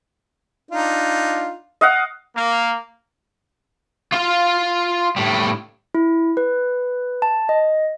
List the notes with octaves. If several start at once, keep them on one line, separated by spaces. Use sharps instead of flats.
D4 D#4 F4
D#5 F5 F#5
A#3
F4 F5
A2 G3
E4
B4
A5
D#5